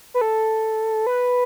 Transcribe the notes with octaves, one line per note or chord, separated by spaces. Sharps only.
B4
A4
B4